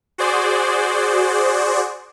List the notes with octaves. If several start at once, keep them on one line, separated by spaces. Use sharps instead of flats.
F#4 G#4 C5 D5